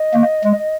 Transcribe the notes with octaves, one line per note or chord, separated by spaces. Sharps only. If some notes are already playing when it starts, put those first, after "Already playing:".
Already playing: D#5
A#3
G#3